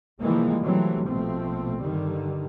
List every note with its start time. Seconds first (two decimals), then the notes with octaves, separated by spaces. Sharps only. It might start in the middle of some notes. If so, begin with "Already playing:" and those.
0.20 C3 E3 F3 G3 G#3 A#3
0.63 E3 F#3 G3 A3 C4
1.05 A#1 B2 F3 A3 C4
1.80 G2 D3 D#3 G3